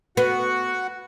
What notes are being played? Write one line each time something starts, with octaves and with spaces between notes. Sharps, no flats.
B3 F#4 F#5